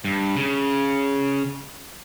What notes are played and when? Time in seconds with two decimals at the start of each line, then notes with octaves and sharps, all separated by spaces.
0.05 G2
0.36 C#3